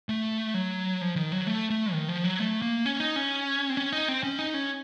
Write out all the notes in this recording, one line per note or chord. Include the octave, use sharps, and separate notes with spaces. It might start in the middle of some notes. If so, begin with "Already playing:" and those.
A3
F#3
F3
D#3
F#3
A3
A3
D#3
F3
F#3
A3
A#3
C#4
D#4
C#4
C4
C#4
D#4
C4
C#4
D#4
C#4